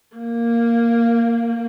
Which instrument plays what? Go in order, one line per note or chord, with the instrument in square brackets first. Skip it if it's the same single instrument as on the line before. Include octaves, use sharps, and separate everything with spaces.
[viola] A#3